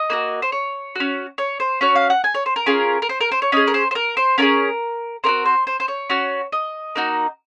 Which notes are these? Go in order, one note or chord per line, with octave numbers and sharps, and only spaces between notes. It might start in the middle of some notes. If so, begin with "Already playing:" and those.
Already playing: D#5
A#3 D#4 F#4
C5
C#5
C#4 F#4
C#5
C5
C#4 F#4 C#5
F5
F#5
G#5
C#5
C5
A#4
C#4 F4 G#4
A#4
C5
A#4
C5
C#5
C#4 G#4 D#5
A#4
C5
C5
A#4
C5
C#4 F4 G#4 A#4
C4 D#4 F#4 A#4
C5
C5
C5
C#5
C#4 F#4
D#5
A#3 D#4 F#4